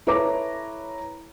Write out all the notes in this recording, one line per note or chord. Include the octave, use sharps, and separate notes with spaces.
E4 A4 B4 C#5 A#5 D6